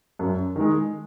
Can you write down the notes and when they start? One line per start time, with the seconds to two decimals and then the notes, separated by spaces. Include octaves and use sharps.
0.19 F#2
0.56 D#3 G#3